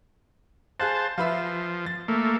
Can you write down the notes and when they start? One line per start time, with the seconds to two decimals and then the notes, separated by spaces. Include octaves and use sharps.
0.80 G#4 C5 F5 A5 F#6
1.18 F3 F4 B4 E5
1.86 A6
2.08 A3 A#3